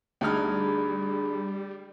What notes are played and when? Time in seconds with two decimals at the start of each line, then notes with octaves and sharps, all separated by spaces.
0.21 D2 G3 D4 D#4 G#4 B5 F6